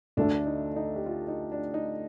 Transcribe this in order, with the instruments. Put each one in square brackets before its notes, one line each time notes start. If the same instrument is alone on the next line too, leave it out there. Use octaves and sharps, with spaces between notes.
[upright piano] D2 D3 A3 [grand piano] D4
[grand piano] D#4
D#4
G4
F4
D#4
D4
D#4